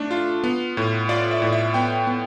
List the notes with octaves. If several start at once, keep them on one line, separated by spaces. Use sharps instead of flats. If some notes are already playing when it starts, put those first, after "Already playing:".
Already playing: A3 D4
F4
B3
A2
F4 D5
E5
A2
E5
B3 G5
B3